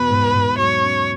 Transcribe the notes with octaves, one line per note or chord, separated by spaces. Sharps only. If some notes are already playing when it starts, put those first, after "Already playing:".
Already playing: E2 B2 B4
G#2
G#2
F#3 C#5
C#4